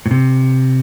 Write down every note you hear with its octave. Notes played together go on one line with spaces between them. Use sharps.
A2
C3